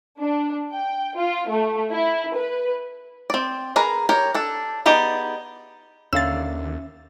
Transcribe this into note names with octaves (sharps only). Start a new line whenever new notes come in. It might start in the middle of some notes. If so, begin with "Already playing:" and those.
D4
G5
F4
A3
E4
B4
C4 D5
G#4 A#4 B4 A#5
G4 A#4 C#5
D4 A4
B3 D#4 G4 G#4 D5
D#2 D3 A#3 C#4 E5 F5 E6 A6